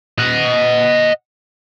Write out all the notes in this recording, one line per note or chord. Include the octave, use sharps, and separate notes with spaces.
D#5 F#5